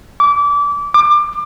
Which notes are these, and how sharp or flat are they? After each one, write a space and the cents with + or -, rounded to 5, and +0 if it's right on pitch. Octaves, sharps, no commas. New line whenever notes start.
D6 -25
D6 +25